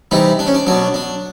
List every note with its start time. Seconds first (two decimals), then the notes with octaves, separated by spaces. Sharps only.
0.11 C3 E3 G3 D#4
0.39 D4
0.47 C#4
0.54 D4
0.67 B2 F#3 D4
0.94 D4